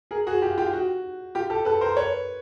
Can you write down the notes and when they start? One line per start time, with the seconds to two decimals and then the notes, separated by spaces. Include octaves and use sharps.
0.11 G#4 A#4
0.27 F#4 G#4
0.42 F4 G4
0.57 F4 G4
0.73 F#4
1.35 F4 G4
1.50 G4 A4
1.65 A4 B4
1.81 A#4 C5
1.97 B4 C#5